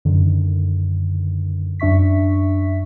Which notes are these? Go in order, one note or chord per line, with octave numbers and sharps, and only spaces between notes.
F#2 D3 D#3
F#2 D4 E5 C#6 B6